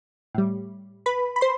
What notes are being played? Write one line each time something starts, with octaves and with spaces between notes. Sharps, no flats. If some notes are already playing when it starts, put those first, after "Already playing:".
A2 G3
B4 B5
B5
C5 C6